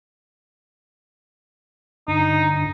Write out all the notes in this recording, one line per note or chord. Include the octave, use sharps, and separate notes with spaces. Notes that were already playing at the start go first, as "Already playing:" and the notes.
G2 D3 D4 D#4